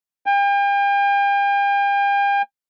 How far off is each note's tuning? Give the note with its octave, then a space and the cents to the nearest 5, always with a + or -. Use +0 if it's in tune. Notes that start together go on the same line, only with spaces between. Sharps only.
G5 +40